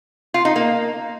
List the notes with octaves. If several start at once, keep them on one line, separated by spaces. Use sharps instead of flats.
F4
D#4
A#3